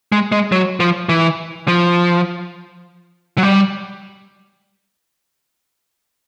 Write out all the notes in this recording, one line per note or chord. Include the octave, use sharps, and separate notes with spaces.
G#3
G#3
F#3
F3
E3
F3
F#3
G3